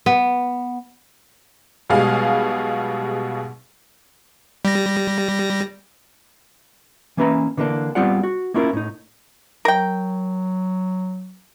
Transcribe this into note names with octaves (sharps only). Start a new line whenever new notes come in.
B3
B1 B2 G3 G#3 G#4 F5
G3 A#6
E3 A#3 C#4 B4 E5 A#5
D3 E3 A#3 C4 D4
G3 B3 C4 F4 D5 F#5
F#4
A#3 C#4 E4 F4 G#4 A#4
A2 D#4
F#3 A#4 G5